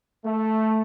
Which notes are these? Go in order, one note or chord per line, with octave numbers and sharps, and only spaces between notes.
A3